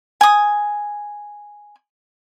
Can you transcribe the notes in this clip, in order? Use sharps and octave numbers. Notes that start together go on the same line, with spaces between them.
G#5 D#6